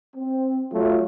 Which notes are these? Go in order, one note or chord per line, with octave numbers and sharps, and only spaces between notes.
C4
F#3 A3 F4